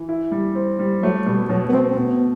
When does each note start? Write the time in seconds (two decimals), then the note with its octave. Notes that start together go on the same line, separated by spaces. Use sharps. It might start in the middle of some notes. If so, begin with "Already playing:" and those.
Already playing: E3
0.09 E4
0.32 G3
0.55 C4
0.79 G3
1.02 F#3 A3
1.26 B2 G3
1.49 B2 F#3
1.69 B3
1.73 A3 C4
1.91 C4
1.97 B2 B3